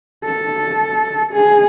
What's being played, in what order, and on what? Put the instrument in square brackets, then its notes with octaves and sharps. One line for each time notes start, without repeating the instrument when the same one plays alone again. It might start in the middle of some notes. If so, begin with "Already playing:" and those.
[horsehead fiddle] A4
G#4